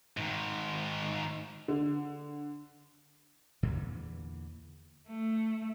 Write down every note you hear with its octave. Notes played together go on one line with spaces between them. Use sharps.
G#2 D#3
D3
E2 A#2 D3 E3
A3